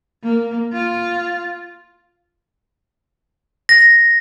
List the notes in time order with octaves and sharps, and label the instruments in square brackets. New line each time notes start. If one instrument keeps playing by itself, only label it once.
[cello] A#3
F4
[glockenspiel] A#6